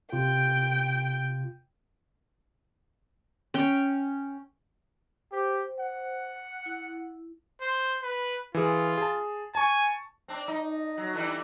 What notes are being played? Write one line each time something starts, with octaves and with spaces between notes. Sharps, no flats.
C3 F4 G5
C#4 G5
G4 C5
F#5
E4
C5
B4
E3 F4 G#4
G#4 A5
G#5 A5 C#6
C4 D4
D#4
F#3
D3 E3 G3